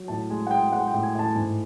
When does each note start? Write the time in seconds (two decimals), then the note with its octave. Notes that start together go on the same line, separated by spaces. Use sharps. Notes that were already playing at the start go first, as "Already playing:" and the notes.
Already playing: F#3
0.08 A2 A5
0.30 G#3 G#5
0.47 F#5
0.51 G#3 G5
0.72 G#3 F#5
0.87 G5
0.93 A2
1.03 G#5
1.15 A2 A5
1.35 G#2 G#5